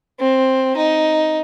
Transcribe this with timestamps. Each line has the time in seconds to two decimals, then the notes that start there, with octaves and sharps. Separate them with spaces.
0.20 C4
0.77 D#4